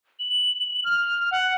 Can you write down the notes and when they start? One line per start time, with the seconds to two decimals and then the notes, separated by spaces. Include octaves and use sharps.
0.19 F#7
0.84 F6
1.31 F#5